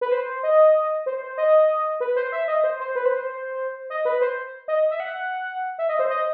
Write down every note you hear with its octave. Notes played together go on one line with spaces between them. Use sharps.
B4
C5
D#5
C5
C5
D#5
B4
C5
E5
D#5
C5
C5
B4
C5
C5
D#5
B4
C5
D#5
E5
F#5
E5
D#5
C5
D#5